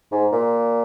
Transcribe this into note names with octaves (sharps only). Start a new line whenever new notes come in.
G#2
A#2